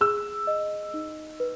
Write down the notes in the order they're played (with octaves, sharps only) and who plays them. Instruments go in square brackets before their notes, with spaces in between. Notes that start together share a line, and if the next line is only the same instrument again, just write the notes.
[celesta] G#4 [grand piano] E6
[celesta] D#5
D#4
B4